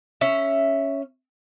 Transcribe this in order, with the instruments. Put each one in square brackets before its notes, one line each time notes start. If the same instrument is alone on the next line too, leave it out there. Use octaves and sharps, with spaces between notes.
[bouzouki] C#4 E5